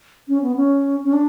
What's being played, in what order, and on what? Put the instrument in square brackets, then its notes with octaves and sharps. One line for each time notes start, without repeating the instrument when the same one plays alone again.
[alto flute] C#4
B3
C#4
C#4
D4